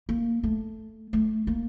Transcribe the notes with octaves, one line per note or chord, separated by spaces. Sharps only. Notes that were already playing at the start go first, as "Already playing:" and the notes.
A#3
A3
A3
A#3